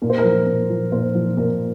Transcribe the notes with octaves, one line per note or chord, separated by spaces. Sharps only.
A#2 A#4
C5
A#4
F3
A#2
F3
A#2 C5
F3
A#2 A#4